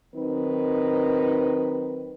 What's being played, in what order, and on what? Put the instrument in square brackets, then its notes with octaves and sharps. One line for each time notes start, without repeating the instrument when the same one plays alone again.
[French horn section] D#3 F#3 C4 D#4 B4